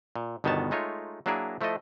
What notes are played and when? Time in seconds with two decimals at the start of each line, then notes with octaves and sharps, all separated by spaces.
0.16 A#2
0.44 G1 B2 D#3 B3 C#5 A5
0.71 G#3 A3 D#4 F4 C#5
1.26 F#3 A#3 D4 E4 G#4 A#4
1.61 F3 A3 E4 A4 D#5